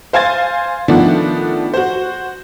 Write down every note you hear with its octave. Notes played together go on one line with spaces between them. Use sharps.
C5 F5 G#5 C6 G#6 A6
D#3 F3 A3 B3 D4
F#4 C5